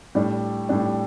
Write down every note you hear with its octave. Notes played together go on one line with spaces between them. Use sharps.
A2 G3 D4
A2 G3 D4